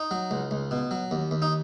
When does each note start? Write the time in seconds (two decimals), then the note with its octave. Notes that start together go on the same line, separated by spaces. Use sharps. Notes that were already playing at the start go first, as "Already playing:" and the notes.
Already playing: D#4
0.11 F#3
0.31 C#2
0.51 C#2
0.71 B2
0.91 F#3
1.11 D#2
1.31 D#2
1.42 D#4